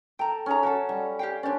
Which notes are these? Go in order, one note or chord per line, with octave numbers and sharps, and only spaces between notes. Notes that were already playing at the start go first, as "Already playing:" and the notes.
A4 G5 A#5
C#4 D#4 G#4 A#5
F#3 F#4 A4 F#5
G3
G4 F5 G5
C#4 D4 C5 D5